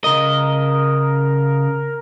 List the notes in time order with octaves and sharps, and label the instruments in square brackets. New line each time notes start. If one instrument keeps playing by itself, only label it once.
[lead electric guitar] C#3 D#5 [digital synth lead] A#4